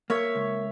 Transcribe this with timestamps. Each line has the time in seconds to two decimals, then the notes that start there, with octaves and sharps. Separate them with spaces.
0.10 A#3 C#5 E5
0.35 C#2